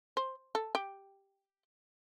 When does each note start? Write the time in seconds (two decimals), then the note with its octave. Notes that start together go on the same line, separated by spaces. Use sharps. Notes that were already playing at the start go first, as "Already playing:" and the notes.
0.17 C5
0.55 A4
0.75 G4